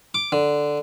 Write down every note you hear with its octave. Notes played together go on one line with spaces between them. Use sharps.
D6
D3